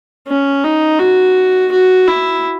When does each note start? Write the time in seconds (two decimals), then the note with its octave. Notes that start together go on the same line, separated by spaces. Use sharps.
0.28 C#4
0.64 D#4
1.00 F#4
1.72 F#4
2.08 E4